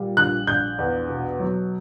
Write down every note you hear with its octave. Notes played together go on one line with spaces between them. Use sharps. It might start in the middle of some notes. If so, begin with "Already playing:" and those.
Already playing: A#2 G3
A#1 F#6
A#1 G6
E2
B2
F#3